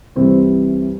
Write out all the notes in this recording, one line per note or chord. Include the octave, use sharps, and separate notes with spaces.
C2 C3 E3 G3 C4